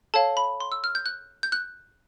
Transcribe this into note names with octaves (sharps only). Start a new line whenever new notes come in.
A4 C#5 F5 A5
B5
C6
E6
F6
G6
F#6
G6
F#6